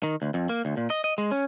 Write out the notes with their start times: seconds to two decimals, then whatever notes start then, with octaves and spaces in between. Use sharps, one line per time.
0.03 D#3
0.22 D2
0.34 F2
0.49 A#3
0.65 D2
0.77 A#2
0.90 D#5
1.04 D#5
1.18 G#3
1.31 C#4